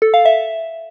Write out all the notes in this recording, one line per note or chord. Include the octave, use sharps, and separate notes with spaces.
A4
F5
E5